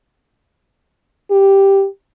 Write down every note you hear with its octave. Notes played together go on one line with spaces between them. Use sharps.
G4